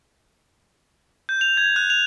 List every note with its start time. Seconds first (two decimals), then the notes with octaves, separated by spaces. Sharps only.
1.29 G6
1.41 F7
1.57 G#6
1.76 F#6
1.90 F7